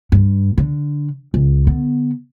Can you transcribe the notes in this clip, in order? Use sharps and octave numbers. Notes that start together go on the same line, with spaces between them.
G2
D3
C#2
D3 B3